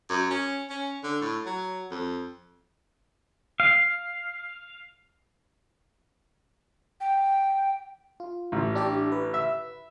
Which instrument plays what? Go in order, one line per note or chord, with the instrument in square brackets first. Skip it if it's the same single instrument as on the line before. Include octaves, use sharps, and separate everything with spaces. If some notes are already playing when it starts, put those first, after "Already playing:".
[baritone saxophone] F#2
C#4
C#4
D3
A2
F#3
F2
[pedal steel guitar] F5
[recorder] G5
[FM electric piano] F4
[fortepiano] A1
[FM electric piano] D4 G4 D5
B4
[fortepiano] E5